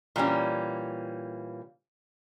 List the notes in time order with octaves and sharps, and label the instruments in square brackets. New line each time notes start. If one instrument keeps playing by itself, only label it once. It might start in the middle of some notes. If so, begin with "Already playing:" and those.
[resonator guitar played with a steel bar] A#2 E3 G3 C#4